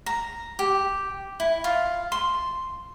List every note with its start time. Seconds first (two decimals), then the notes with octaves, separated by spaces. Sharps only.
0.06 A#5
0.59 G4
1.40 E4
1.64 F4
2.12 C6